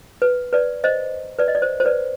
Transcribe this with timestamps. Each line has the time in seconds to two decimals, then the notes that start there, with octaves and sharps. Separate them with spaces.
0.22 B4
0.53 B4 D5
0.84 C5 D#5
1.39 B4 D5
1.48 D#5
1.55 D5
1.62 C5
1.80 C5
1.85 B4 D5